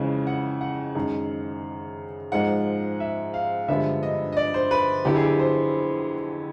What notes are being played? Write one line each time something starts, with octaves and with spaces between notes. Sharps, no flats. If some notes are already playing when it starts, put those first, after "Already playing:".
Already playing: F2 C#3 E3 G#3
F#5
F#5
F#2 D#3 G#3
G#2 F3 G#3 F#5
E5
F5
G2 D3 F3 G#3 B3 E5
D#5
D#5
D5
C5
B4
F2 D3 F#3 B3 E4 G4
G#4
G4
C5